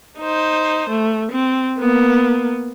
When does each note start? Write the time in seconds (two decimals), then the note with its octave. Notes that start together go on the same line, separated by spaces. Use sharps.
0.19 D#4 C5
0.90 A3
1.31 C4
1.80 A#3 B3